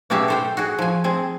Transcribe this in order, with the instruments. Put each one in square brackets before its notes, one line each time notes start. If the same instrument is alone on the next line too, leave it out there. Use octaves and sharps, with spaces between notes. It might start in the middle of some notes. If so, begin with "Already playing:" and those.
[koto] B2 F#3 C#4 G4 G#4 E5
A4 C5 G5
F#4 G#4
F3 G#5
C4 G#4